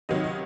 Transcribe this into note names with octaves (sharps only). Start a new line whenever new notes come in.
C#2 C3 D#3 F#3 D#5
D#5